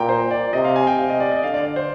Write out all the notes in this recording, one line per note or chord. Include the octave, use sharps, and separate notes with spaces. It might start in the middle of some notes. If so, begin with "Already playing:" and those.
Already playing: A#2 G5 A#5
C5
D5
C3 D#5
F5
G#5
G5
C3 F5
D#5
D5
D#5
D3 F5
D5
D5
C5